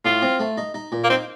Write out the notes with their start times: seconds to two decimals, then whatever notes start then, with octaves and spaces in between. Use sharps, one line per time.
0.05 A2 F4
0.22 C4
0.39 A3
0.57 D#4
0.74 D#4
0.92 A#2
1.04 A#3
1.10 C4 D#4